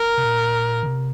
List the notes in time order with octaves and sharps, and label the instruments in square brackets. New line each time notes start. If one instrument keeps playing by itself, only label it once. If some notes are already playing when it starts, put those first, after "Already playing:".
Already playing: [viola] A#4
[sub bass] C3
A#2
D3
C3